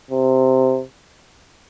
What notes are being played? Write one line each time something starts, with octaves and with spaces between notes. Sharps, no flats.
C3